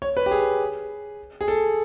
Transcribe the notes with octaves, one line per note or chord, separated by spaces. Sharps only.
C#5
B4
G4
G#4
G#4
A4